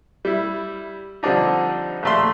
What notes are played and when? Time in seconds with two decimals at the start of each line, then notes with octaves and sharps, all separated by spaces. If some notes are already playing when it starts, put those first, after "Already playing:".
0.25 G3 E4
1.23 D3 F3 G3 C4 D4 D#4
2.03 A#1 D#2 A3 D5 C6